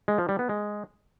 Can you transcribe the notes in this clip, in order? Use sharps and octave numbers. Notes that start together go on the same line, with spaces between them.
G#3
F3
G3
B3
G#3